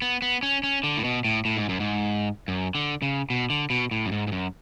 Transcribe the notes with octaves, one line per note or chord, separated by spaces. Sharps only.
B3
B3
C#4
C#4
D3
A2
B2
A2
A2
G#2
F#2
G#2
F#2
D3
C#3
B2
D3
B2
A2
F#2
G#2
G#2
F#2